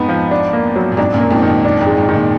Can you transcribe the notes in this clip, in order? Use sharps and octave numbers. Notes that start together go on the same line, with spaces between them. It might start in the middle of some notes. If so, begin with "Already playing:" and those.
Already playing: F2 G#2 B3 D#4
F3
D4
A#3
F#3
A#2
F2 G#2 D4
F#2 A#2
A#3
F2 G#2
D#3
F2
D4
F2 G#2
G#3
F2 G#2
D#3
A#2